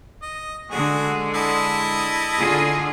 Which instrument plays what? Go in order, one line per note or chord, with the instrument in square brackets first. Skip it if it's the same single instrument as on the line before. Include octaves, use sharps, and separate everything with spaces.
[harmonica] D#5
[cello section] D3 G#3 [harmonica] F#4 G#4
[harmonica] E4 D#5 A5
[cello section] D3 F4 G#4